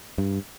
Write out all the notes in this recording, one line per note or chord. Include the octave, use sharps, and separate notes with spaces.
G2